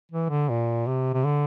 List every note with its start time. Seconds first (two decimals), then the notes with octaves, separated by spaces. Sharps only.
0.12 E3
0.29 D3
0.49 A#2
0.87 C3
1.14 C3
1.24 D3